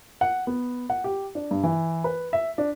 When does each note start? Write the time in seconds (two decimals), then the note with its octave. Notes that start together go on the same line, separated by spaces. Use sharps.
0.21 F#5
0.47 B3
0.90 F#5
1.04 G4
1.35 D4
1.51 G2
1.64 E3
2.04 B4
2.33 E5
2.58 D4